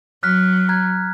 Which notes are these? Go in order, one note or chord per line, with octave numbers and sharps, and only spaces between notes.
F#3 F6 F#6 B6
A#5 F#6 G#6